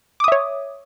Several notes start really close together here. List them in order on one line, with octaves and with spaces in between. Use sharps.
D6 D#6 E5 C#5